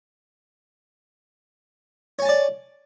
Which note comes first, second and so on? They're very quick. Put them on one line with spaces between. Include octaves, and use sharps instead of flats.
C#5 G#5 A5 D5